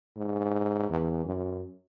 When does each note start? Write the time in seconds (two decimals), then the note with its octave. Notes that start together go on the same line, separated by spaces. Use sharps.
0.17 G#2
0.89 E2
1.25 F#2